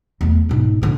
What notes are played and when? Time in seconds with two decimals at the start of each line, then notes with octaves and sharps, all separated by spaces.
0.21 E2 A3
0.49 E1 G#2
0.82 A2 D3